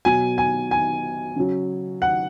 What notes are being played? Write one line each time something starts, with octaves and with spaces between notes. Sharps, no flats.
B2 F#3 G#5
G#5
G#5
C#3 F#3
F#5